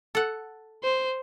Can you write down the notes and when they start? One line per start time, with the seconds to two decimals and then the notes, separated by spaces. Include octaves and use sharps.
0.15 A4 F#5
0.84 C5